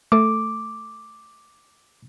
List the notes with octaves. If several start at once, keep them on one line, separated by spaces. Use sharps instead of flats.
A3 A4 D6